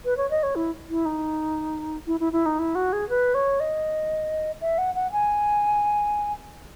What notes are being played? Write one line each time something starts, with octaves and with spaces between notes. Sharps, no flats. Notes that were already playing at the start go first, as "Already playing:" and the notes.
B4
C#5
D#5
C#5
E4
E4
D#4
E4
E4
E4
D#4
E4
F#4
G#4
B4
C#5
D#5
E5
F#5
F#5
G#5